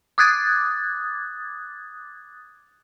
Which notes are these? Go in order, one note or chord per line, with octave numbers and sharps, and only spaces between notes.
D6 D#6 F#6 G#6 A6